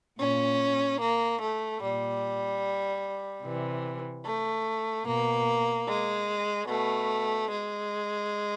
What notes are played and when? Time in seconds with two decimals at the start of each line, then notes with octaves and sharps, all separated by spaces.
0.19 A#2 C#4
1.00 A#3
1.41 A3
1.82 A#2 G3
3.44 C3 E3
4.25 A3
5.06 B2 A#3
5.87 G#3
6.68 B2 A3
7.51 G#3